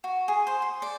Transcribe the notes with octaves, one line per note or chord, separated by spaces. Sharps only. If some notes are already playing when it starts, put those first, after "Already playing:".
F#4
G#4
C5
C6
D5